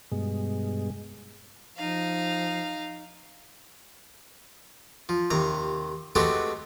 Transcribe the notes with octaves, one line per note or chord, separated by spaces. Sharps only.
G2 B2 G#3
F3 D#4 F5
F3
D#2 C3 A#5
G#3 A3 B3 C4 F#4 G4